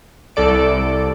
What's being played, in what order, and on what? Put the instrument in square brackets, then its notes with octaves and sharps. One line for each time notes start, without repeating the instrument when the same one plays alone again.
[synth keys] C2 A4 D5 D7